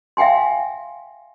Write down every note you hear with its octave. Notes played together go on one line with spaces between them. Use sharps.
E5 F5 G5 G#5 C6